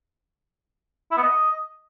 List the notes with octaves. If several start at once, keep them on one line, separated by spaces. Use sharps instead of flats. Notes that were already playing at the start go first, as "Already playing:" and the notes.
E4
B3
D#5